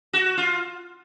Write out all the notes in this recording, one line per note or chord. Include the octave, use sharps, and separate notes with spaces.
F#4
F4